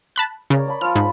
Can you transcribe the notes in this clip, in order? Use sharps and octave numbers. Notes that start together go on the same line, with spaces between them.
A5 B5 F#6
C#3 A#4 C#5 D5
D5 A5 B5
F3 F4 F6
G#2 B5